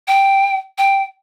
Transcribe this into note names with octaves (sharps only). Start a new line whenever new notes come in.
G5
G5